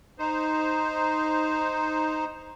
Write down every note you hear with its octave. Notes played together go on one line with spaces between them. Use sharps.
D#4 C5